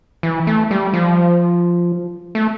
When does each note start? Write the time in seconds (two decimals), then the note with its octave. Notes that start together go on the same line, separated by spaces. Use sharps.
0.23 E3
0.47 A3
0.71 G3
0.94 F3
2.35 A3